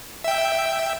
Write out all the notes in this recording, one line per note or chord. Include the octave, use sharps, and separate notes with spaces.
E5 G5